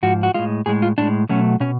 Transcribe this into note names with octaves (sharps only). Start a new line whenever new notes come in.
G#2 F3 F#4
F#4
A2 G#3 F4
A2 G#3 G#4
F4
A2 G#3 D4
B2 F#3 A3 C#4
B2 C#4